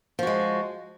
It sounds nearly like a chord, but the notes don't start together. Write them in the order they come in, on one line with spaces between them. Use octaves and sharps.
F3 F#4 G#3